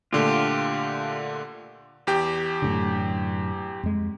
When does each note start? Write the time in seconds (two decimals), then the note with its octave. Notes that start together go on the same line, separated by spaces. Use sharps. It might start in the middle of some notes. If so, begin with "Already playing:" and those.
0.13 A#2 D3 A3 F4 G4
2.07 E2 G4 G5
2.62 F#2 A2 D3
3.83 F2 G#3